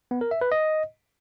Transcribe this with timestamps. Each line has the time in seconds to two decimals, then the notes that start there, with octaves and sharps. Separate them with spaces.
0.11 B3
0.21 A#4
0.31 E5
0.41 B4
0.52 D#5